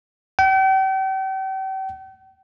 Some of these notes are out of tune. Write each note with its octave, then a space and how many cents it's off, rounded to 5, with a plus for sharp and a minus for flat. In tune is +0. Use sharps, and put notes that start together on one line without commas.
G5 -40